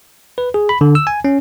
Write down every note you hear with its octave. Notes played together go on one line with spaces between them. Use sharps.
B4
G#4
B5
D3
E6
G#5
C#4